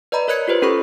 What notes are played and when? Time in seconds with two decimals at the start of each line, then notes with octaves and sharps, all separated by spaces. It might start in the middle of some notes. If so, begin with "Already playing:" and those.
0.12 B4 D5 D#5 A#5 B5
0.28 A#4 C#5 D#5 F#6 G#6 C#7
0.48 F4 G4 B4 C5
0.62 C#4 G4 A4 B4 B5 C#6